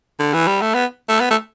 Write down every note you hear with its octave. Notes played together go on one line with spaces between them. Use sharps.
D3
E3
G3
A3
B3
A3
B3
A3